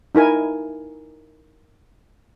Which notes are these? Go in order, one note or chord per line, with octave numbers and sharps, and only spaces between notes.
D#4 E4 A#4 G#5